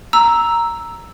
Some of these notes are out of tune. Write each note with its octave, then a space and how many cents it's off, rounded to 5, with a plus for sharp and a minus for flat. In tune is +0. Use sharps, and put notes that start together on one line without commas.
A#5 +0 E6 +0